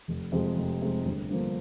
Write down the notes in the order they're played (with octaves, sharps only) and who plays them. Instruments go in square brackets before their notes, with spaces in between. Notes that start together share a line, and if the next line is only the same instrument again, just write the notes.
[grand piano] F1
F2 C3 F3 G#3
F1
F2 C3 F3 G#3
G1
G2 D3 F3 A#3